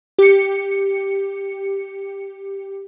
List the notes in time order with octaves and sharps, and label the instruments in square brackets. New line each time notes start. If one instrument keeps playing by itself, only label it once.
[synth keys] G4 C#7